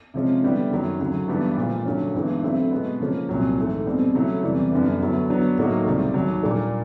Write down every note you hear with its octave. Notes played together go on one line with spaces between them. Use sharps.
C3 F3 G#3 C#4
D3 G3 B3 E4 G4
F#2 D#3 F#3
D2 C#3 F#3
G2 E3 G3 B3 D4
A#2 F3 G#3
G2 D3 F#3 A3 C#4
G2 E3 G#3 B3 D#4
D3 F#3 A3 C4 E4
B2 G#3 B3
C#3 F3 A#3 C#4
C2 A#2 F#3
G#2 E3 A3
B2 G3 C4
C#3 F#3 A3 C#4 E4
E2 C3 E3 G3
F#2 D3 G3 B3
D2 D3 F#3 B3 E4
D3 F#3 B3 D4
A2 F#3 A#3 D#4 F#4
C#2 C3 D#3 G3 C4
D#2 D#3 F#3
A#2 G3 A#3 D4